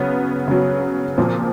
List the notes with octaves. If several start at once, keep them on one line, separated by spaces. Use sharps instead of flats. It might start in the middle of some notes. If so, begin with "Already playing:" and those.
Already playing: C#3 F#3 B3
C#3 F#3
A#2 F3 C4